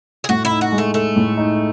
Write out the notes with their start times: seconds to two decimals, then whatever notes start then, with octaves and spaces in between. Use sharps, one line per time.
0.24 G#4
0.29 A2 F#4
0.45 E4
0.51 D#4
0.61 F#4
0.72 G#3
0.78 A3
0.94 A3 A4
1.16 A2
1.38 D#4